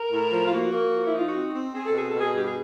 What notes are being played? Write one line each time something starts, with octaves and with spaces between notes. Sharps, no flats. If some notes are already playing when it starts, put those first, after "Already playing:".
Already playing: A#4
A2
F3
F4
A#3 F#4
A#3
F3
E4
D#4 F4
F#4
C4
C4
C4 G#4
A4
B2 G#4
A4
B2
G#4
G2 G4
G#4